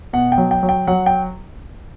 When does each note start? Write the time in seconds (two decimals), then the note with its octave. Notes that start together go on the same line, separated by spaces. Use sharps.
0.13 B2 F#5
0.32 G5
0.38 F#3
0.51 G5
0.63 F#3
0.69 G5
0.87 F#3 F#5
1.06 G5